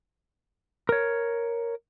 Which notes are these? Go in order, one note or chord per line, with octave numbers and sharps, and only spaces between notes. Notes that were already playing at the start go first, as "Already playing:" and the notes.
A#4 C#5